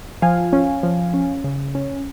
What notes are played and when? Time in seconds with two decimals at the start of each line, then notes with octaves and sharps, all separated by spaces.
0.22 F3 F5 G#5
0.53 C#4
0.83 F3
1.14 C#4
1.44 C#3
1.75 C#4